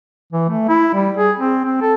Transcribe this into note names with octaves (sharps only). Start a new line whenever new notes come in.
E3
A3
E4
G3
G#4
C4
C4
A4